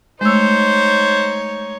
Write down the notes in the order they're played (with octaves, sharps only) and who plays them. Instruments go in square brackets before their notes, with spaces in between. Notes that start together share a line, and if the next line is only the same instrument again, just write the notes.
[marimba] G#3 A3 E6 [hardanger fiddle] D#4 C#5 [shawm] C5